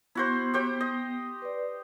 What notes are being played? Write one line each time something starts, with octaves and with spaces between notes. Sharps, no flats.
B3 E4 F#4 C5
G4 C5 G5
D#5
B4 D5